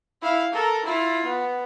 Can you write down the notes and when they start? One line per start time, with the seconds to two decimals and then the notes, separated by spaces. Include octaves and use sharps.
0.22 E4 F5
0.53 A4 A#4
0.85 E4 F4
1.24 B3